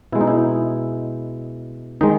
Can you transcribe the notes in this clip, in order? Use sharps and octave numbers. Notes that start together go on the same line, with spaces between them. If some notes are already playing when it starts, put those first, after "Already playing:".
B2 G#3 E4
D#4
E4
D#3 G#3 D#4